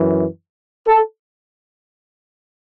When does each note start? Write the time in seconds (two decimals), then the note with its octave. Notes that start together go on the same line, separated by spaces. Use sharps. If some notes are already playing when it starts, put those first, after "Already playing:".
Already playing: F#2 E3
0.88 A4